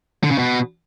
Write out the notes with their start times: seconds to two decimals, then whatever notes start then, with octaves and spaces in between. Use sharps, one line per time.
0.23 D3
0.31 C#3
0.38 B2